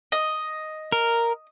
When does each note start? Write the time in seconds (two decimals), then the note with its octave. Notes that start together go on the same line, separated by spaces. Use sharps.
0.12 D#5
0.92 A#4